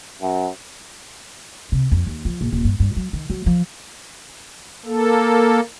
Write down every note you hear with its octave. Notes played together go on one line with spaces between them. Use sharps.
F#2
C3
F2
D#2
F3
A#1
D#1
G2
G2
F#3
D#3
F#3
F3
A#3 A4